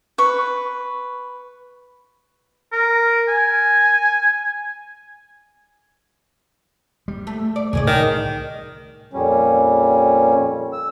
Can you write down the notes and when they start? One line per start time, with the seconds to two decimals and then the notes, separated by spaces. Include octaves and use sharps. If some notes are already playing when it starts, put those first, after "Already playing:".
0.18 B4 C#6
2.73 A#4
3.29 G#5
7.08 G3
7.27 A3
7.56 D5
7.73 C2 A2 D3 G#4 C#5 D5
7.87 D#3
9.13 F2 A#2 G3 C#4
10.73 E6